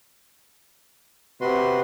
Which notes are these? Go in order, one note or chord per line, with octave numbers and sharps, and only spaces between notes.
C3 F#4 B4 C6